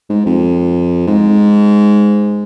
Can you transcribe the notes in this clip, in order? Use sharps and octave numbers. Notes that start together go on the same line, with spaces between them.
G#2
F2
G#2